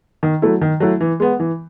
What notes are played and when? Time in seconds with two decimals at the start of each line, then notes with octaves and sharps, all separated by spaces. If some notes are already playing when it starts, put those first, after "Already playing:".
0.23 D#3
0.42 F#3 A3 E4
0.61 D#3
0.80 F#3 A3 E4
1.01 E3
1.20 G#3 B3
1.40 E3